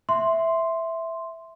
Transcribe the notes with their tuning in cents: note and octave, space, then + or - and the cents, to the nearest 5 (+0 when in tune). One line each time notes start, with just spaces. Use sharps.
E5 +0 C6 +0